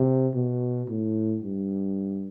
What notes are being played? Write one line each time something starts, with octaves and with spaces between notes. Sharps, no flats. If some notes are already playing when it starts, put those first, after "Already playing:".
Already playing: C3
B2
A2
G2